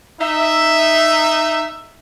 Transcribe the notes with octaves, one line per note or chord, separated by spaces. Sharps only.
D#4 E5